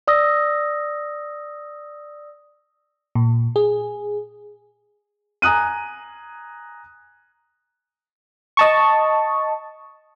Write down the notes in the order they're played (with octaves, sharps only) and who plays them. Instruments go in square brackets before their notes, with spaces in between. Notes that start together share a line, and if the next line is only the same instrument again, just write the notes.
[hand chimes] D5 D#6 E6 A#6
[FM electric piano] A#2
G#4
[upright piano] G#5 A#5 D#6 F#6 D#7
[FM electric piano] D#5 A5 C#6